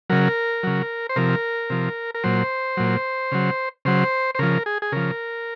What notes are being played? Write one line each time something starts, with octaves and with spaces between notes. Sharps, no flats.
C#3 F#3 A#4
C#3 F#3
C5
C3 F3 A#4
C3 F3
A#4
A#2 F#3 C5
A#2 F#3
C#3 F#3
C#3 F#3 C5
C5
C#3 F3 A#4
G#4
G#4
C#3 F3 A#4